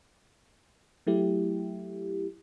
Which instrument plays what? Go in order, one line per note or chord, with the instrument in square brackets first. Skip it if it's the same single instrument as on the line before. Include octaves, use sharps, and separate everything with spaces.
[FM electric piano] F#3 A3 E4 G4